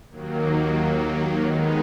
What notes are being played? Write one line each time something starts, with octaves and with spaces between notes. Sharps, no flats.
D#2 D#3 F#3 A#3
D#3 G#3 B3 D#4